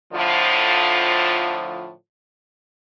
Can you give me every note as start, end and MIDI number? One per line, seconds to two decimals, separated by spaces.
0.13 1.90 45
0.13 1.90 50
0.13 1.90 53